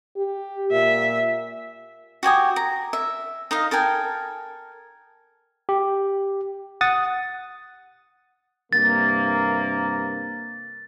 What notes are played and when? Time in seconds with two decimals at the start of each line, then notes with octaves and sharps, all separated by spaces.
0.16 G4
0.72 A#2 E5
2.23 F#4 G4 G#5 D#6
2.56 A#5
2.93 E5
3.51 D#4 D#5 F5
3.71 A4 A#4 G5 G#5
5.69 G4
6.81 F#5 D#6 A6
8.73 G2 C3 A#3 A6